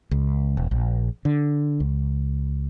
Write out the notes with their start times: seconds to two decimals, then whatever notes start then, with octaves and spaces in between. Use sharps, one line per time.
0.11 C#2
0.57 E1
0.71 A#1
1.25 D3
1.80 C#2